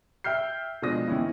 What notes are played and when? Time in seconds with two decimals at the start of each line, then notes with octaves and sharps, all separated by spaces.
0.24 E5 G5 F6 G6 C7
0.82 B2 F3 G#3 D4 D#6 A#6
1.08 D#3 E3 B3 C#4 E4